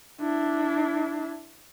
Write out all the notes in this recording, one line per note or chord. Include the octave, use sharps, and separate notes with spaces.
D4 E4